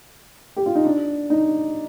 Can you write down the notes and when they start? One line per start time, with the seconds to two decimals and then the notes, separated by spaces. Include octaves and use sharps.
0.56 G4
0.66 F4
0.75 D#4
0.85 D4
1.30 D#4